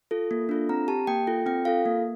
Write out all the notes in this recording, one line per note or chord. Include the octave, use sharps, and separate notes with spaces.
F4 A4
A#3
D4 F4 A4
C4 A#5
G4 A5
A#3 G5
F4 A4
C4 G5
F4 A4 F5
A#3